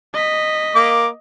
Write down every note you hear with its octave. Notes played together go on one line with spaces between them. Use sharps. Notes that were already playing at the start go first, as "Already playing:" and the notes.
D#5 B6
A#3 D6